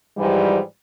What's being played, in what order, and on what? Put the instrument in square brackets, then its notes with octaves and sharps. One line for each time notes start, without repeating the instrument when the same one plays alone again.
[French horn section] G#2 E3 F3 G3